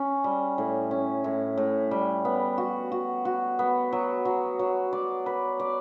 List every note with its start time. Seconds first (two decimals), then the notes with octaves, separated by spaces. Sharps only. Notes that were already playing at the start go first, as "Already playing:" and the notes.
Already playing: C#4
0.24 G3
0.58 A2
0.91 C#4
1.24 A2
1.58 A2
1.91 G3
2.25 B3
2.58 F#4
2.92 F#4
3.25 F#4
3.59 B3
3.92 F#3
4.25 F#3
4.59 F#3
4.93 D5
5.26 B4
5.60 D5